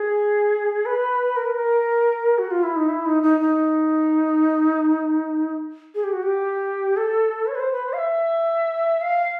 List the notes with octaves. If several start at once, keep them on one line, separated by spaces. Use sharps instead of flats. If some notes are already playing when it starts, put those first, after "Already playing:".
Already playing: G#4
B4
A#4
B4
A#4
F#4
F4
E4
D#4
E4
D#4
D#4
D#4
G#4
G4
F#4
G4
A4
C#5
B4
C5
B4
C5
F5
E5
F5